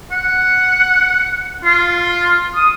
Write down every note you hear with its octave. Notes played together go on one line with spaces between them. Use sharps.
F#5
F4
D#6